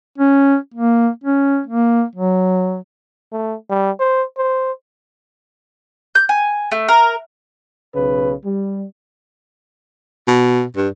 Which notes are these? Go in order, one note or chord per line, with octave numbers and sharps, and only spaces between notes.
C#4
A#3
C#4
A#3
F#3
A3
G3
C5
C5
G6
G#5
A3
A#4
B1 C#3 B4
G3
B2
G2